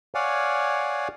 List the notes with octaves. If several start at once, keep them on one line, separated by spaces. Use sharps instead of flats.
C#5 D5 F5 F#5 G#5